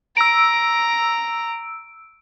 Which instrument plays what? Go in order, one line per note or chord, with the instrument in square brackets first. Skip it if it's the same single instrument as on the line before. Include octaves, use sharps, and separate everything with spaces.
[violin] A#5 [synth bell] E6 D7